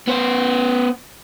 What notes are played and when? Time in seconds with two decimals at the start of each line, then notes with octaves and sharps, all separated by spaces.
0.07 B3 C5